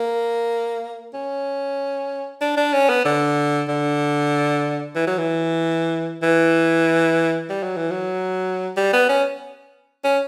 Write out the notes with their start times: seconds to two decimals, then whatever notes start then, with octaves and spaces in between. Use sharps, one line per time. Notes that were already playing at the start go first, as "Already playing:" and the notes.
Already playing: A#3
1.14 C#4
2.41 D4
2.57 D4
2.73 C#4
2.89 B3
3.05 D3
3.68 D3
4.95 E3
5.07 F#3
5.18 E3
6.23 E3
7.50 G3
7.63 F#3
7.77 E3
7.91 F#3
8.77 G3
8.93 B3
9.09 C#4
10.04 C#4